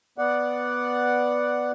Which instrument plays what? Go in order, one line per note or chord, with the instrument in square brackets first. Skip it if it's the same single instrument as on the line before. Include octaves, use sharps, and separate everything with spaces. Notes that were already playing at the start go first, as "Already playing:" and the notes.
[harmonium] B3 D5 F#5